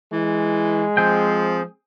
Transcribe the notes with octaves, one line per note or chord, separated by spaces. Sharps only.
E3 G#3
F3 C4 G#4 G5